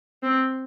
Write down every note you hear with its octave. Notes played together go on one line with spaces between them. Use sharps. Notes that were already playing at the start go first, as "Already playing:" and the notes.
C4